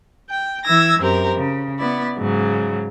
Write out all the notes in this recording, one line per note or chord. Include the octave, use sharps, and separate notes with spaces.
G5
E3 E6 G#6 A#6
F#2 C4 G4 A#4
C#3
B3 E4 D5
G#2 C#3 F#3